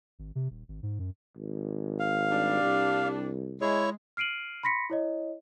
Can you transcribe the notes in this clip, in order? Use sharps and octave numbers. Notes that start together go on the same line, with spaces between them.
G#1
C3
D#1
G#1
G#2
F#2
G#1
F5
G3 D4
C2
G#3 E4 C#5
F6 C7 D7 D#7 F#7
B5 C6 A#6 B6 C#7
E4 C#5 D#5